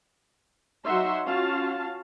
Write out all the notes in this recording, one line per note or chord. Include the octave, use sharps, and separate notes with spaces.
F#3 D#4 E5 F#5 C6
C#4 F4 F#4 F5 A5